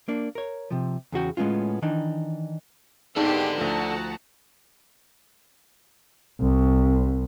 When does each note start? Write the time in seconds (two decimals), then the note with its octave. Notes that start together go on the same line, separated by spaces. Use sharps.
0.08 A#3 D4
0.35 A#4 C#5
0.71 C3 F3
1.12 E2 C#3 F#4 G5
1.37 A2 G#3 B3 C#4 F4
1.82 D#3 E3 D4 D#4
3.16 G#1 G#3 B3 D#4 G4 A4 D5 C6
3.58 D2 F3 F#4 A5 A#5
6.41 C2